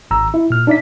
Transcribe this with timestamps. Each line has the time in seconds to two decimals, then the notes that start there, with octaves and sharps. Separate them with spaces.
0.11 G#1 A#5 E6
0.34 E4 E5
0.50 A#2 F6
0.67 D4 D#4 D5 E5 B6